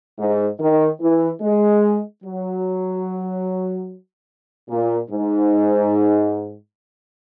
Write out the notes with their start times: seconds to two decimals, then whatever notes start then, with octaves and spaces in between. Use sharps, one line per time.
0.18 G#2
0.59 D#3
1.01 E3
1.42 G#3
2.24 F#3
4.70 A#2
5.11 G#2